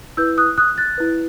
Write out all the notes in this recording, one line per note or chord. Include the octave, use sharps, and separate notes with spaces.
E4 B4 E6 G6
D#6 F#6
D#6 F#6
F#6 A6
E4 B4